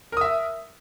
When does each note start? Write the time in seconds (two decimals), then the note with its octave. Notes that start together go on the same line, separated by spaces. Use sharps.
0.12 A#4
0.17 D#6
0.21 E5